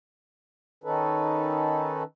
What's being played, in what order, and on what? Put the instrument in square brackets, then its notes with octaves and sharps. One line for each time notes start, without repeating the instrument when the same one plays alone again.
[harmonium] D#3 C#4 D#4 A4 B4